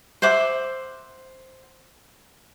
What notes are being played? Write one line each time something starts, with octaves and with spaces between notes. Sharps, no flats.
C5 E5 F#5 D6